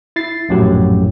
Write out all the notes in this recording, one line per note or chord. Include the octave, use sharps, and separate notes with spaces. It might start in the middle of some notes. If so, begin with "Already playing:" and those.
E4 A6 C7
A#1 F#2 A2 F#3 G4